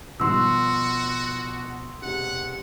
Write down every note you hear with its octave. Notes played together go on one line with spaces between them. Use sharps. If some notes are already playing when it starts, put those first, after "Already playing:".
G#2 B2 D#3 F3 G3 F#4 C6 E6
E1 C3 F#5